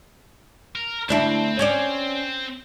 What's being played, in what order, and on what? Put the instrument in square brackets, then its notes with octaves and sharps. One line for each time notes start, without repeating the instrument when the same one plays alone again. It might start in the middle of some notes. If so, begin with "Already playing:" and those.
[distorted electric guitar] A#4
[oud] D2 D4 E4 [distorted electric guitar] C4
[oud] C#4 C#5 D5